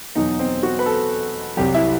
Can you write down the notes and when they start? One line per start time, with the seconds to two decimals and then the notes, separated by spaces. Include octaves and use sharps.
0.15 E2 B2 F#3 D#4
0.39 C4
0.63 F#4
0.79 B4
0.86 A4
1.57 C2 C3 F#3 G4
1.74 E4